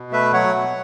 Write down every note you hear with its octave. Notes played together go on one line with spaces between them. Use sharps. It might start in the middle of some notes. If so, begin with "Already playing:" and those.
Already playing: B2
A3 B4 E5
F#3 C#5 F#5
B2